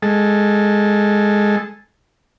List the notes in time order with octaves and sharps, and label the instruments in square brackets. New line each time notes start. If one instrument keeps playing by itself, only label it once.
[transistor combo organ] G#3 A4